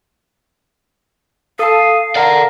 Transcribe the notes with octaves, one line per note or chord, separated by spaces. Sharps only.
A4 F5 A5 D#6
A#4 D5 F#5